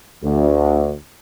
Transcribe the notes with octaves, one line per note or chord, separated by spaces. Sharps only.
D2